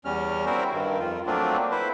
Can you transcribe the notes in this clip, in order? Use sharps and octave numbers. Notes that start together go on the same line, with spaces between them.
E2 G3 C#4 F6
C4 E4 F#4 A#4 C5
G2 D#3
F2 F4
F#3 A3 A#3 C4 D4 F4
E4 B4 C5